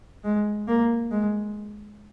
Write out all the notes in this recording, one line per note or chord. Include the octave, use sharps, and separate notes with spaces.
G#3
A#3
G#3